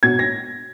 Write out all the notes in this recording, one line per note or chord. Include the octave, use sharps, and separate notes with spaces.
B2 G#6
A#6